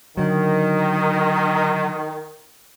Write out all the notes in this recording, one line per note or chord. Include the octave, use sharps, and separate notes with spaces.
D3 D#3 F#3